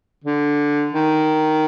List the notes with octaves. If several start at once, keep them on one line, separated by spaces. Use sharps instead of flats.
D3
D#3